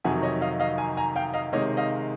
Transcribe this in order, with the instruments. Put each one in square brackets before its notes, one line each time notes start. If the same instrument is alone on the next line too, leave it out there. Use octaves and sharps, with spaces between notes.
[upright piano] F2 C3 D#3 F#3 F#5 G#5
C#5 D#5
D#5 F5
D#5 F5
G#5 A#5
G#5 A#5
F5 G5
D#5 F5
C3 D#3 G#3 C#5 D#5
D#5 F5